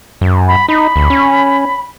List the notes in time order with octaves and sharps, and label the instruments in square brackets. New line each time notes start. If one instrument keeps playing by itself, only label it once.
[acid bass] F#2
[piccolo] B5
[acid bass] D#4 [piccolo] B5
[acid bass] D2
C#4